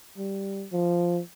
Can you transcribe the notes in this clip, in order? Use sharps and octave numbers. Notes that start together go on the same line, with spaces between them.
G3
F3